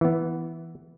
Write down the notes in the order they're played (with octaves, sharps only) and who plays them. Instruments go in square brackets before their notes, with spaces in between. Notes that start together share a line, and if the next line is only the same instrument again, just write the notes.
[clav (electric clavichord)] E3 B3